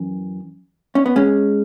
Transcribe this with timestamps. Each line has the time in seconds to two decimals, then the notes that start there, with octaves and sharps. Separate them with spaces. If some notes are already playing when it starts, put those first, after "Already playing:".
Already playing: F#2 E3
0.95 C#4
1.06 B3
1.16 G#3 C#4